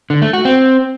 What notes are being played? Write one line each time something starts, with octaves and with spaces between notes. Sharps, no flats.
D3
A3
F#4
C4